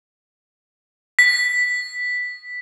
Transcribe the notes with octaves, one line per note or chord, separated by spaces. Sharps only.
B6